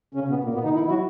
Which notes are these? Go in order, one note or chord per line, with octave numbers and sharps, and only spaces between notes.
C#3 C#4
B2 B3
A#2 A#3
B2 B3
D#3 D#4
E3 E4
E4
F#3 F#4